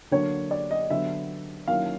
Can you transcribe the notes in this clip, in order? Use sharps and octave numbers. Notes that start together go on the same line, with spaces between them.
D3 F#3 A#3 D4 C#5
D5
D#5
D3 F#3 B3 E5
D#3 F#3 A#3 C#4 E4 F5